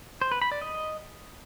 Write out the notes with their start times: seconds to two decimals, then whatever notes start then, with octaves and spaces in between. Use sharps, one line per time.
0.22 C5
0.32 B4
0.42 B5
0.52 D5
0.62 D#5